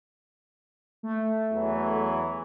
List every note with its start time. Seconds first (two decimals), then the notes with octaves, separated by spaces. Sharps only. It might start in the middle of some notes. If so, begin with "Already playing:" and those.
1.03 A3
1.52 E2 E3 F#3